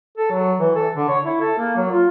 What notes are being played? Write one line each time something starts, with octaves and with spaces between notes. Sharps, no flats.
A4
F#3
E3
A4
D3
C#5
E4
A4
A#3
F#3
F4